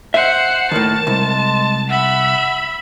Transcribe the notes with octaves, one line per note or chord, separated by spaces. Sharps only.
C5 E5 F#5
D#2 A2 A#4 A5
C2 G#3
E5 F#5 B5